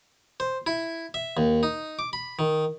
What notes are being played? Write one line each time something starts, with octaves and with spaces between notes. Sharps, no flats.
C5
E4
E5
D#2
D#4
D6
B5
D#3